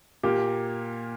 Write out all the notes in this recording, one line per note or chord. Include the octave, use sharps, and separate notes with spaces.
A#2 A#3 G4